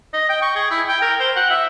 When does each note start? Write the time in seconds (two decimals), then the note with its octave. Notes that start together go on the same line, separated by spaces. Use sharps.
0.13 D#5
0.29 G5
0.42 C#6
0.55 G#4
0.70 E4
0.88 G5
1.02 A#4
1.20 C5
1.36 F#5
1.50 E5